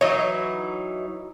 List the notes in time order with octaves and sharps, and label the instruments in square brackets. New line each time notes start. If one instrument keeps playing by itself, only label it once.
[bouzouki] E3 F#3 D#4 [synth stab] C#5 D#5